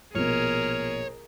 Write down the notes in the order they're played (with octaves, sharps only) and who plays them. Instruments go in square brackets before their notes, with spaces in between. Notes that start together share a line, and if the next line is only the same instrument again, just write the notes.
[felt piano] A#1 B2 [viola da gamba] G#4 A#4 [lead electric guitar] C#5 [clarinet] F6